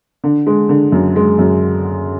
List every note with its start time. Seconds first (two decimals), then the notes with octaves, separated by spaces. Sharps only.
0.24 D3
0.47 G#3
0.69 D3
0.92 F#2
1.16 G#3
1.39 F#2